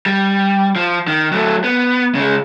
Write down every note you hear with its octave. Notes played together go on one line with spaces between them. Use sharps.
G3
F3
D#3
F#3 A3
B3
C#3 G#3